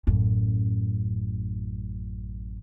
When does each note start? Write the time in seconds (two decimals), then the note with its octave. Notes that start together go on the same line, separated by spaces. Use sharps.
0.07 A1 F#2